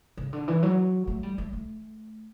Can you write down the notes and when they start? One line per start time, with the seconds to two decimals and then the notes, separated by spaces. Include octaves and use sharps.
0.17 C#3
0.33 D3
0.48 E3
0.63 F#3
1.07 A3
1.23 G3
1.38 A3
1.53 A3